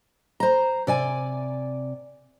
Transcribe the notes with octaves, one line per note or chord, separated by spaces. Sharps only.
C5 A#5
C3 D5 G#5